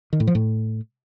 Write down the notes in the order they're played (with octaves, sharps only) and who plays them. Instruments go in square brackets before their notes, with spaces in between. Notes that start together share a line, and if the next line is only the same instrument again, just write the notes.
[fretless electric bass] D#3
A2
F3
A2